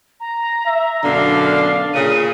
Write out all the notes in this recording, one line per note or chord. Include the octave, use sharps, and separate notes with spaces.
A#5
E5
F#2 B2 D3 D4 F5
A#2 C#3 D#7